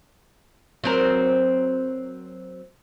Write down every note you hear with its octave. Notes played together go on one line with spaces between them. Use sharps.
F#3 C4 A#4